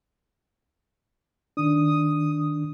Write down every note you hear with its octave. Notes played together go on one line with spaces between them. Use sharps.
D#3 D4 D#6